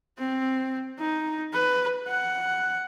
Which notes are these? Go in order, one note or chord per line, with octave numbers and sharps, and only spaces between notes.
C4
D#4
B4
F#5